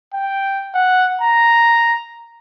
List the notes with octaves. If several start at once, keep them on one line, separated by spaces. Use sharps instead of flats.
G5
F#5
A#5